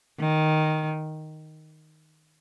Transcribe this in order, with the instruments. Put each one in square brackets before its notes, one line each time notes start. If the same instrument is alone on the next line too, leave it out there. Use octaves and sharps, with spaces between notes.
[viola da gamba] D#3